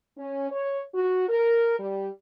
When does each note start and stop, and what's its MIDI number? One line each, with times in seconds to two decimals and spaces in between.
0.17 0.47 61
0.50 0.80 73
0.93 1.24 66
1.29 1.75 70
1.78 2.08 55